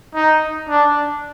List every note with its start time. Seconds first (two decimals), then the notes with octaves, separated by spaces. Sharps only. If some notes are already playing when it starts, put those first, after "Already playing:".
0.15 D#4
0.69 D4